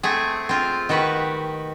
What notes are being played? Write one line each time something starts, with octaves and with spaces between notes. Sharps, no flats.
A3 C4 G#4
C4 F4
D#3 F#4 G4 B4